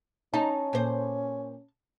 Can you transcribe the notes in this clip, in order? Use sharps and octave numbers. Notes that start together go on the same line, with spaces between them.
C#4 D#4 A5
A#2 C5